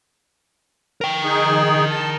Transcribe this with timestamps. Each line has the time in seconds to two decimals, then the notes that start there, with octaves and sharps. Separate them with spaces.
1.01 A#4 G5
1.24 D#4 G#4
1.90 A5